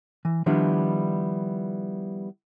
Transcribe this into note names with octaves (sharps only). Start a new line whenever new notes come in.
E3
D#3 F3 G3 B3 D4 E4